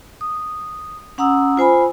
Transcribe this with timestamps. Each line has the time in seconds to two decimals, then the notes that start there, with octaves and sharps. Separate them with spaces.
0.21 D#6
1.18 C#4 F#5 A#5 D#6 E6
1.57 F4 C5 G#5 B5